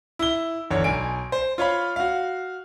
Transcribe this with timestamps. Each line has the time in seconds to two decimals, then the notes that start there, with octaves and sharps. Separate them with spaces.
0.19 E4 G7
0.70 G1 E2 C#5
0.84 B1 G#5 D7
1.32 C5
1.58 F4 C#5 F5 B5
1.96 F#4 F5